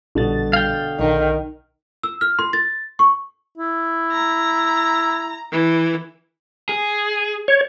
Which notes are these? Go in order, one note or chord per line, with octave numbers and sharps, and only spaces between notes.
A#1 B2 D3 G3 A6
F5 G5
B1 D#3 D4
E6
F6
C6
A6
C#6
E4
A#5
E3
G#4
C#5